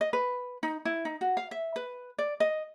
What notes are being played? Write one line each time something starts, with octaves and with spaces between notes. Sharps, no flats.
D#5
B4
D#4
E4
D#4
F#4
F5
E5
B4
D5
D#5